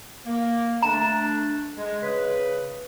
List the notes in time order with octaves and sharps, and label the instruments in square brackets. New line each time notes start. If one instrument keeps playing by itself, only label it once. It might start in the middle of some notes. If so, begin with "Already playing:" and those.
[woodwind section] A#3
[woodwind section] A3 D4 [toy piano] A#5
[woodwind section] G#3
C#3 B4